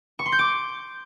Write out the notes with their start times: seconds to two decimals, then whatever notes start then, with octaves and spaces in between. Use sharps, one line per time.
0.19 C#6
0.26 C6
0.32 G6
0.39 D6